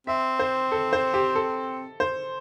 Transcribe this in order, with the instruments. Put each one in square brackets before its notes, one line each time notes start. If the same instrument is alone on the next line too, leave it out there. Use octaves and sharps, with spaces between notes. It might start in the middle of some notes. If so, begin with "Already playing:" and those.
[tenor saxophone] C4 [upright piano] E5
[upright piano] C5
A4
C5
G4
A4
C5